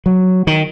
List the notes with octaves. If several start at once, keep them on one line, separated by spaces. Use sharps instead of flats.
F#3
D#3